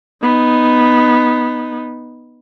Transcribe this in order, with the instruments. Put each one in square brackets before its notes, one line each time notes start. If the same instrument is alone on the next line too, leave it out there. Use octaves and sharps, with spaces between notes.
[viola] B3 D#4